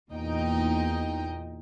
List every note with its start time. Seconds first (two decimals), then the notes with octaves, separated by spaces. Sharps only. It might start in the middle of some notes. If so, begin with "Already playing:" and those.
0.11 E2 A#2 D#4 D#5 G5